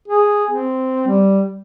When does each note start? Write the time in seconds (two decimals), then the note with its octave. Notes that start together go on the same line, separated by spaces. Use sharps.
0.08 G#4
0.51 C4
1.08 G3